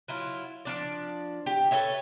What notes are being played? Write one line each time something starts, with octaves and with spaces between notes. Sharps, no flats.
F#3 E4 F4
F3 D4 D5
G4
A4 B4 C#5 E5